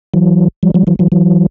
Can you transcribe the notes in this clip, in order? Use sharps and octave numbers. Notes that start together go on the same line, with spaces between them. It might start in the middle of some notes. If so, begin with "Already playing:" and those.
E3 F#3
F3 G3
F3 G3
E3 F#3
E3 F#3
E3 F#3